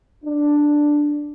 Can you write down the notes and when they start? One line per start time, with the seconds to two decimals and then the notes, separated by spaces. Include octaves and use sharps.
0.25 D4